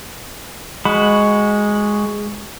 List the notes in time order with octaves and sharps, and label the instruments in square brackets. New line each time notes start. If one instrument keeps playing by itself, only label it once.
[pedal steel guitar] G#3 F#4 B5